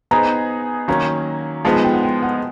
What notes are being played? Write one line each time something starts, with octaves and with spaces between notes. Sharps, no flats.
B3 D#4 G#4 C5 A#5
D#3 F#3 A#3 C#4 A#5
F3 G#3 B3 D#4 A5
G#5
G5
F#5
G5
F#5